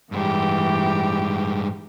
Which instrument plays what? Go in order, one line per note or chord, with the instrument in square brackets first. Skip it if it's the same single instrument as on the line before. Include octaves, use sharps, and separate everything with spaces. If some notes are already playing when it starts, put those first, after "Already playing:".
[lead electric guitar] G2 G#3 [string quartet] E3 G4